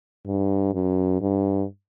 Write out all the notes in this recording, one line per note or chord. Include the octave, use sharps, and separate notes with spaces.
G2
F#2
G2